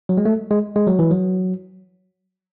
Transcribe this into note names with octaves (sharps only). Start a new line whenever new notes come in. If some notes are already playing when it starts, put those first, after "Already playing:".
F#3
G#3
A3
G#3
G#3
F#3
E3
F#3